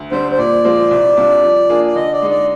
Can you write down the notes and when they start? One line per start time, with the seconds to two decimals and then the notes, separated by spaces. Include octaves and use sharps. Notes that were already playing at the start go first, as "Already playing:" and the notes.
Already playing: D2
0.12 D3 G3 C4 C5
0.32 C5
0.38 A#2 D5
0.64 F3 G#3 C4 F4
0.91 C2
1.17 C3 G3 D4 F4
1.43 F3
1.69 A#3 D4 F4 G#4
1.87 D5
1.96 D3 D#5
2.13 D5
2.22 G#3 D#4
2.30 D5